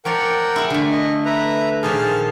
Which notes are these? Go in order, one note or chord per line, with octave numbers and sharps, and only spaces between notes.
F3 A#4 C#5 D5 F#5 G5
E4 G#4
D3 A3
D#5
B4 E5 A#5
A#2 D#3 F3 G#4 A5 F6